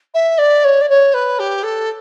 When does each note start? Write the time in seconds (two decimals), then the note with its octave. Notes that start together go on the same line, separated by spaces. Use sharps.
0.14 E5
0.38 D5
0.64 C#5
0.81 D5
0.89 C#5
1.14 B4
1.39 G4
1.63 A4